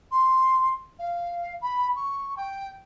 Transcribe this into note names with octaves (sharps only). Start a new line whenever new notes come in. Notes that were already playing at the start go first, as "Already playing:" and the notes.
C6
F5
B5
C#6
G5